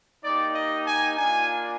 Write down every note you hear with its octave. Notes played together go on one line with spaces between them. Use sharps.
A#3 D#4 G4 D5
D#5
G#5
A#3 D4 F4 G#5